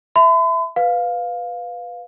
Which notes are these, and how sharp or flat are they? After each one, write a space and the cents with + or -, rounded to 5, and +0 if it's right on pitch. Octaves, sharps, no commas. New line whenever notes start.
E5 +0 B5 +45
B4 +0 F5 +10